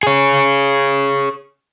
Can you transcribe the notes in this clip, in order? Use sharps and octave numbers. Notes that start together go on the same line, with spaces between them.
G#4 C#5